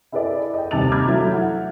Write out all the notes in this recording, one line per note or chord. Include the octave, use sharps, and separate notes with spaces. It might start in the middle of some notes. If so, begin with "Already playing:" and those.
E4 G#4 A4 B4 D5 D#5
D#5 G5
D#2 C3 G3 A5 A6 F7
A#5 B5 D6 F6 G6 G#6
E3 F#3 A3 E5
F#5